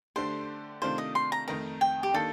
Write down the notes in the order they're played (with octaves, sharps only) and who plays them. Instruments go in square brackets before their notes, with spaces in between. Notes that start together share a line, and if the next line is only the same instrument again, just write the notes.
[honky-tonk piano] D3 A3 D4 G4 [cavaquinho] C5
[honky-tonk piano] C3 D#3 A3 D4 F4 [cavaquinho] C5
[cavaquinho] D#5
C6
A#5
[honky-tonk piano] F2 D#3 A3 D#4 A#4 [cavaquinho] A#5
[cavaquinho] G5
G4
[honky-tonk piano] D#3 A#3 D4 G4 [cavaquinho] A4